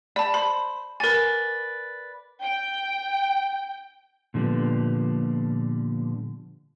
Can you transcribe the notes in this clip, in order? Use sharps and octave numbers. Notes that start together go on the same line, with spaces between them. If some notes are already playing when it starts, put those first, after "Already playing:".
D5 A5 B5
C5 B5
A#4 B4 D5 G#5
G5
A#2 D3 F3 G3 B3